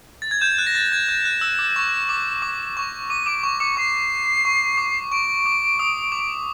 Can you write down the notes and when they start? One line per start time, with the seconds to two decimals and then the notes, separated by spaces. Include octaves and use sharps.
0.22 A6
0.31 G#6
0.41 G6 E7
0.59 F#6
0.67 A#6
0.75 A6
0.92 G#6
1.09 G6
1.25 F#6
1.41 E6
1.59 D6
1.76 C#6
2.09 D6
2.42 D6
2.77 C#6
3.10 D6 D#7
3.26 D6 D7
3.43 C#6
3.60 D6 C#7
3.77 C#6 C7
4.45 C#6
4.77 D6
5.12 C#6 D7
5.46 D6
5.79 D#6
6.12 D6